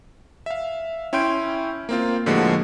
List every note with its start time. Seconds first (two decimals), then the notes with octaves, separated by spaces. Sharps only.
0.46 E5 F5
1.13 C#4 E4 G5 C6 G6 D7
1.89 A#3 C4 F4
2.26 A2 D3 F3 G#3 A#3 F#4